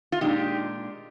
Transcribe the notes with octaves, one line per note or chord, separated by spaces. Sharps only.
F4
A#2 G#3 D4 D#4 G4